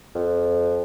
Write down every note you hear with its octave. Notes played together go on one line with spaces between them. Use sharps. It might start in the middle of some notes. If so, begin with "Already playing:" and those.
F2